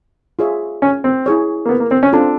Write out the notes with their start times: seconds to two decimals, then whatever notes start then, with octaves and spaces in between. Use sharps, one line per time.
0.39 F4 G#4 C#5 E5
0.82 C#4
1.04 C4
1.26 E4 G#4 C#5
1.65 A#3
1.69 B3
1.80 A#3
1.91 C4
2.03 C#4
2.13 C4 D4 F4 A4